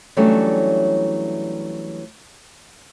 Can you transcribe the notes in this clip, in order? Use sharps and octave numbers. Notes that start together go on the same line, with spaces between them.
E3 F#3 G3 A3 C#4 D4